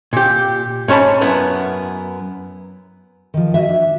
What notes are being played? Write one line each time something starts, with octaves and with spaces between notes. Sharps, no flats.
A#2 G4
G#2 C#4 C#5 A5 B5
F#2 B3 E4
D#3 F3
F#4 D#5 E5
D4